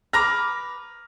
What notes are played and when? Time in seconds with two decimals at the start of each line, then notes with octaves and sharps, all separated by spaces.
0.13 B4 A#5 D6 F6 A#6